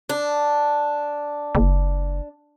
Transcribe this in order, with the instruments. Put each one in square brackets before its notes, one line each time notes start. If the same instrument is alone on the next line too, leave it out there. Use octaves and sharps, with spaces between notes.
[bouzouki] D4
[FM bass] F#1